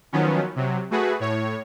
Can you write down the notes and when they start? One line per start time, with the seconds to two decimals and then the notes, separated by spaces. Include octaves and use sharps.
0.13 D#3 F3 F#3 B3 C#4
0.56 C3 F#3
0.91 A3 F#4 G#4 B4
1.20 A2 C#5